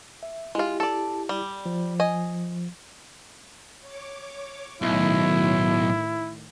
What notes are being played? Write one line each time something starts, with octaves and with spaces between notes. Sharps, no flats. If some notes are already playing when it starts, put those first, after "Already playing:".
E5
G#3 E4 F4 G4
A4 D5
G3
F3
D#5 G#5
C#5 D6
B1 A2 D#3 E4